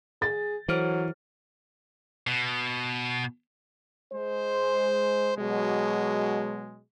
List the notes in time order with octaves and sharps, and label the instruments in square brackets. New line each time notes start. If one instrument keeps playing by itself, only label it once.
[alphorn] G#4 [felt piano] A6
[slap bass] E3 [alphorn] F#3 [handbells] A4 C5 F6
[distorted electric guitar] B2
[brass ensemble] G#3 C5
B2 F#3 G#3